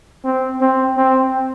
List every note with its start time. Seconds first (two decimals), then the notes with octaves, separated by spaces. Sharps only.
0.25 C4
0.61 C4
0.97 C4